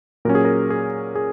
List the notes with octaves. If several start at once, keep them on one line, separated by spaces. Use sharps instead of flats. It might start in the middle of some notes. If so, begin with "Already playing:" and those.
A#2 F#3 C#4 A#4
G#4
A#4
G#4
G#4